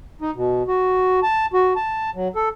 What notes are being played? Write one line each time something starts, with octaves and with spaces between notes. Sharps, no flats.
D#4
B2
F#4
A5
F#4
A5
F#3
A4